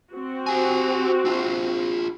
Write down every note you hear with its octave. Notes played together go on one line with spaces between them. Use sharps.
C4 F#4
G4 G#5
D4 F4